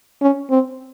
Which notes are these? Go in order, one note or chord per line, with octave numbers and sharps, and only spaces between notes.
C#4
C4